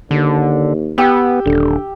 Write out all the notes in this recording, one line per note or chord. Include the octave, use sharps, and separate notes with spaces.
D#2 D3
B3 G4 G5 E6
D#1 D3